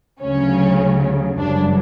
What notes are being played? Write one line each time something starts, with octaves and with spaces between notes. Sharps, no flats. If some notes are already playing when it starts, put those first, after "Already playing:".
D2 C#3 F#3 C#4
G1 F#2 C#3 E3 G3 D4